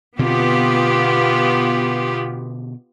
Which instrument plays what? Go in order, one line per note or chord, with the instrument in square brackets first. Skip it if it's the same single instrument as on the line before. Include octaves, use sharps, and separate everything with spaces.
[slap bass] B2 D3 C4 [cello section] B3 F4 G4